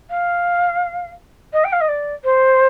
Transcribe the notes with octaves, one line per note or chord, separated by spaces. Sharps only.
F5
D#5
G5
F5
D#5
D5
C5